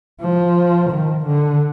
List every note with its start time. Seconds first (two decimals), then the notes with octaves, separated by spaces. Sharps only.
0.21 F3
0.90 D#3
1.25 D3